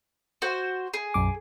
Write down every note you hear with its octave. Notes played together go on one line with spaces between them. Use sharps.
F#4 C5
G#4
B1 F#2 D6